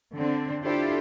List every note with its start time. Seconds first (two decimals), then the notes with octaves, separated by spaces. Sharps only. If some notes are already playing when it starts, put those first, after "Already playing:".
0.15 D3 C4 D4
0.63 D4 E4 F4 G4 A4 C5